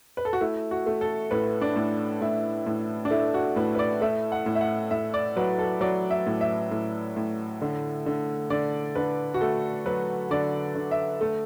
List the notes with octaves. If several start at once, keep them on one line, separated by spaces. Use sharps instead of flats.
B4
A4
F#4
A3 E4
F#4
A3
A4
A2 B4
D4
A2
A2 E4
A2
D4
A3 E4
F#4
A2 B4
B4
D5
A3 E5
F#5
A2
E5
F#5
A2 E5
D5
F#3 B4
A4
F#3 D5
E5
A2
E5
A2
A2
D3
D3
D3 D5
D3 B4
F#4
A3 A4
F#3 B4
D3 D5
D3
E5
A3